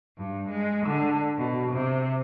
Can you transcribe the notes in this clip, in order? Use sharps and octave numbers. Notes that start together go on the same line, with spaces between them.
G2
G#3
D3
B2
C3